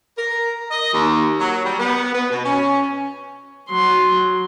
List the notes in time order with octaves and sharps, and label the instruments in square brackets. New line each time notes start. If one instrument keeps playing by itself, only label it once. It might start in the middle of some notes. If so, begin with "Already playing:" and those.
[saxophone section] A#4
D#5
D#2
F#3
G3
B3
B3
B2
C#4
[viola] F#3 C6